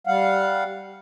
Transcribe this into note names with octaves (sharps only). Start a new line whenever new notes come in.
G3 F5 F#5